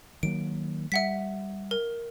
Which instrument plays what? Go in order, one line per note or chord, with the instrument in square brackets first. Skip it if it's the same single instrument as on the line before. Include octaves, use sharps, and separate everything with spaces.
[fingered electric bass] D#3 F#3 A#3 [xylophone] D7
[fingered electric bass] G3 [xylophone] E5 F#5 B6
[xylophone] A#4